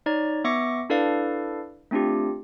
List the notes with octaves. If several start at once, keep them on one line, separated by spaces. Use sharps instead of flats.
D#4 C#5 D5 A#5
B3 E5 C#6 D6 A#6 C#7
D4 E4 A4 B4 D5 F5
A3 C4 D4 F4 G4